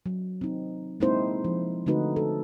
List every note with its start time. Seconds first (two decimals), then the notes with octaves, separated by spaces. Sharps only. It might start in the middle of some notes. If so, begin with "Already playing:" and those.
0.06 F#3
0.41 C4 D#4
1.00 G#3 A#3 C4 D#4 E4 C5
1.45 F3
1.86 D3 A3 C4 D#4 F#4 B4
2.16 A4